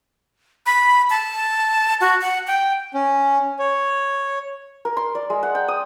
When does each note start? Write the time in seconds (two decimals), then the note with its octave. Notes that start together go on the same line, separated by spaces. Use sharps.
0.66 B5
1.10 A5
2.01 F#4
2.21 F#5
2.47 G5
2.94 C#4
3.59 C#5
4.85 A#4
4.97 C6
5.15 D5
5.30 G#3
5.43 F#5
5.55 G5
5.68 D#6